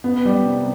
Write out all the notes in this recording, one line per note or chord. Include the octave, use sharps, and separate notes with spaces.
B3
G3
C3